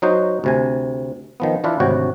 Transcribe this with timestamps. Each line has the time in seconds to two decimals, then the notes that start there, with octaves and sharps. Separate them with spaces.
0.02 F#3 D#4 F#4 C5
0.44 D2 C3 G#5
1.40 D#3 F3 B3
1.64 E3 D4 E4 F4 B4
1.80 G#1 D2 C3 F#4 C#5 G5